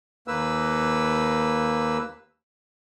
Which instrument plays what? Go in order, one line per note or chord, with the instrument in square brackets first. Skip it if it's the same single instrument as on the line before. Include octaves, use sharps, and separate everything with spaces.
[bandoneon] D#2 A#3 B4 E6